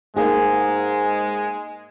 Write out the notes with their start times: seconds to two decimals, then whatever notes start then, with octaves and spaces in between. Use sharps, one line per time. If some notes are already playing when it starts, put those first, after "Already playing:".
0.16 G#2 G#3 A#3 D#4 G#4